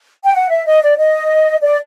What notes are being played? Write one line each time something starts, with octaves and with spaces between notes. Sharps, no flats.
G5
F#5
E5
D#5
D5
D#5
D5